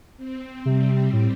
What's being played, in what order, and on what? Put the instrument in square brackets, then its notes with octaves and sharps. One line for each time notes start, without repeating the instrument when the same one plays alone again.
[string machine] C4
[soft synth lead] C3 [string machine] G3
[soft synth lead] A2